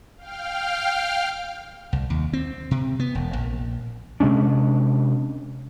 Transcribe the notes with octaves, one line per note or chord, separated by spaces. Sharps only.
F5 G5 F6
C2
D#2
C4
C3
B3
E1
A#1
C3 G#3 C#4 D4